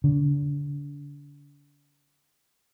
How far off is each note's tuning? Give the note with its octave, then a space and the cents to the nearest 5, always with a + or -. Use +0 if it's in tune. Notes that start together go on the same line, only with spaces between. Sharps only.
D3 -35